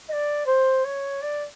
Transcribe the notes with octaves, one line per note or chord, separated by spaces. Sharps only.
D#5
D5
C5
C#5
D5